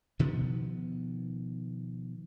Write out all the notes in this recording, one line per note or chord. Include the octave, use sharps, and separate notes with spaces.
B2 D#3 F3 B3